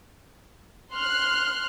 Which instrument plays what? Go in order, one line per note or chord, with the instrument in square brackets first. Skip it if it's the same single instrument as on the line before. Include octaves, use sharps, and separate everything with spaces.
[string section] C6 F6 F#6